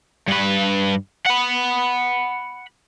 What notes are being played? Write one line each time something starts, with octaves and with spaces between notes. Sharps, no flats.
G2 B4
F#5 B5